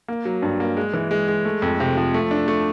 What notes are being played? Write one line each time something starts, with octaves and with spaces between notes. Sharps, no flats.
A#3
F#3
G2
A#3
G#3
E3
G#3
G#3
A3
F2
C3
F3
A3
D4
A3